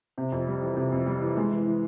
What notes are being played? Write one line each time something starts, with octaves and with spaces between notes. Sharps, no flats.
C3
F2
G3
E3
C3
F2
G3
E3
G#3
E3
E3